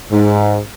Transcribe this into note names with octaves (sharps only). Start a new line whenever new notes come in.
G#2